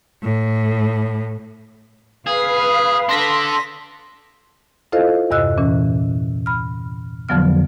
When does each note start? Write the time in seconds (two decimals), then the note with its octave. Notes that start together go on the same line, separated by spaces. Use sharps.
0.22 A2
2.27 G#4 B4 F5
3.09 D4 A4 C6 A#6 B6
4.92 E4 F4 A4 C5 D#5 F5
5.31 E2 G2 C3 D#5 E6 F#6
5.58 A#2 E3 C#4
6.46 B5 F6
7.29 F2 D3 F3 F#3 B3 F6